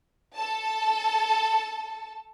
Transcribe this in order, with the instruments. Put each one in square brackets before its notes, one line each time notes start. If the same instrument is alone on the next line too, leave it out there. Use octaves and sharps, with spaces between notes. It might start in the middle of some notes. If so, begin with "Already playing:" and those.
[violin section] A4 A5